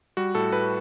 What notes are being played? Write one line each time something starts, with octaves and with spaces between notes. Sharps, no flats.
G3 F#4
A2 A4
A2 B4